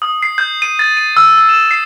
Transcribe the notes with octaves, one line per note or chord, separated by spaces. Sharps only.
D#6
C7
G6
D#7
A6
D#7
E6
E6
E7
C7